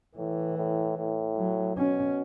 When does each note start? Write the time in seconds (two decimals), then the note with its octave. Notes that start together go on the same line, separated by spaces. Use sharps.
0.17 A2 E3
0.57 A2
0.97 A2
1.36 F#3
1.77 B2 C#4